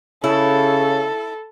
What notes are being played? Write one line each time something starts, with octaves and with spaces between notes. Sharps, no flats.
C#3 E4 A4